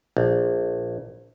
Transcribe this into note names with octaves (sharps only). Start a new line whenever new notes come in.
A#1